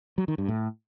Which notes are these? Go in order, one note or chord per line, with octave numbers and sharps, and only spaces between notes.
F#3
D#3
G2
A2